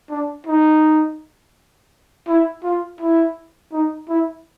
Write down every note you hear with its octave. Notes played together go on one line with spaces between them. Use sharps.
D4
D#4
E4
F4
E4
D#4
E4